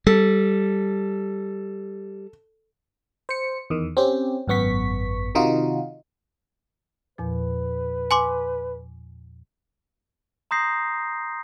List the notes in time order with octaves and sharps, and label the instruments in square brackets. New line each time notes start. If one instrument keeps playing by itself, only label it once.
[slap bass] G3 [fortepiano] A4
[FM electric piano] C5 C#7
E2 D#3
C4 C#4 G4
G#1 F#2 B3 C#6 B6
C3 D#3 D#4 F4 F#4
[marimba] E2 A#2 F3 [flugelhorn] B4
[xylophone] G#5 C6 D6
[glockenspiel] A#5 C6 D#6 G6 A#6 C7